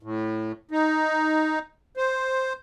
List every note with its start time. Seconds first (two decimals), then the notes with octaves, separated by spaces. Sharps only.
0.03 A2
0.71 D#4
1.97 C5